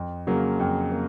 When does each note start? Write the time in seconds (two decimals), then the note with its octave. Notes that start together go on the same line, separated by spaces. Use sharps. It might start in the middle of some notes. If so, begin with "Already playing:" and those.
Already playing: F2
0.27 C#3 F#3 A#3
0.60 F2
0.92 A#3